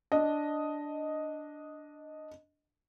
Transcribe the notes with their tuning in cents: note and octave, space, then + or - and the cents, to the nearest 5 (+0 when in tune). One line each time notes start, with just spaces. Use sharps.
D4 +0 D#5 +0